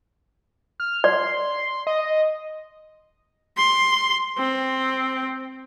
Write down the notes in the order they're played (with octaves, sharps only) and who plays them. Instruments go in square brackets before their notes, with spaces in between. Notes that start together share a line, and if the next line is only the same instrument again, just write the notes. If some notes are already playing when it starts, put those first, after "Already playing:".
[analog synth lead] F6
[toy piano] D5 [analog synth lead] C6
[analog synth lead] D#5
[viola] C6
C4